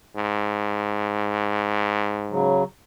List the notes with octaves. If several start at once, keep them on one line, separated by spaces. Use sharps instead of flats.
G#2
C#3 F#3